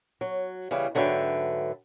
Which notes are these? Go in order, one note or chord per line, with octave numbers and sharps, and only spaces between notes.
F#3
C#3 E3 G3
G#2 D3 F#3 B4 E5 G5